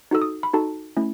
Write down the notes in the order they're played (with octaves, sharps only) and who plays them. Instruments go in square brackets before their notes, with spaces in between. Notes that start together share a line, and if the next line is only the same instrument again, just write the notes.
[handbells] D#4 F#4 A4 E6
D#6
B5
D#4 F#4 A4 A5
A3 C#4 E4